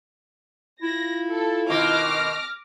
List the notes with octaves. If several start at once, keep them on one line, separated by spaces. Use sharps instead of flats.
E4 F4 A#6
A4
B2 D#3 C4 D6 F6 A#6